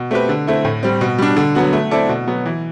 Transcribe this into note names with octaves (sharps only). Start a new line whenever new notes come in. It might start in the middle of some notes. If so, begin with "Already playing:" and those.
Already playing: B2
A3 C4 G4 B4
D3
A3 C4 E4
A2
G3 C4
B2
G3 D4
D3
F#3 B3 F#4
A3
C4 E4 A4 D5
B2
F#3 B3
E3